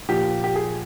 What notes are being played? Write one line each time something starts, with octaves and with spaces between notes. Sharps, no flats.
A#2 F3 G4
G4
G#4